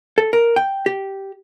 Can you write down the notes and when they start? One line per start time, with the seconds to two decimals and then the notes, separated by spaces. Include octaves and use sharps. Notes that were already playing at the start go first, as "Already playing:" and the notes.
0.18 A4
0.33 A#4
0.56 G5
0.86 G4